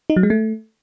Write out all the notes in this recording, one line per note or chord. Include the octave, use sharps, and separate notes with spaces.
D#4
F#3
G#3
A3